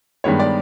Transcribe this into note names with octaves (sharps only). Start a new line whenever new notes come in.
G2 D#3 G#3 B3 C#5
D5